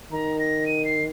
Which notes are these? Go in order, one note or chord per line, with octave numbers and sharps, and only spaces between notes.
D#3 A#5
A#6
D#7
C7